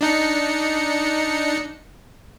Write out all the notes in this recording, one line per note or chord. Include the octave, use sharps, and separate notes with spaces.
D4 D#4 C#7